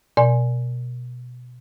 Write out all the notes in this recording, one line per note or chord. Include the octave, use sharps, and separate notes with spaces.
B2 D5 G#5